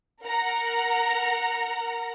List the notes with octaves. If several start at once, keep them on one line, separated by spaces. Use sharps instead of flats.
A#4 F#5 A#5